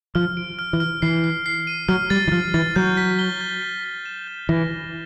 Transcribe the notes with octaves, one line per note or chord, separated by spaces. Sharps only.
F3 F6
D7
F6
E3
F6
E3 C7
C7
C7
D#7
F#3 F6
G3 A6
E3
F3 F6
E3 A6
F#3 G6
B6
G7
G6
B6
B6
E7
G6
E3 A#6
A#6